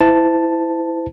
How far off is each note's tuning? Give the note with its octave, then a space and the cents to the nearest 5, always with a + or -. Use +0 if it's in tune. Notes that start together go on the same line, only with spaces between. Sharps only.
E4 +0 C5 -40 A5 +5